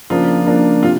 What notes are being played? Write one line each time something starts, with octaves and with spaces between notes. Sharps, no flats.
C#3 F3 A#3 D4 F4
C#3 F3 A#3 D4
C3 F4